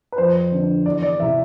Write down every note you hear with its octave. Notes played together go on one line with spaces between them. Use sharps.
B4
F2 C5
D3
E2 D5
D5
C3 E3 E5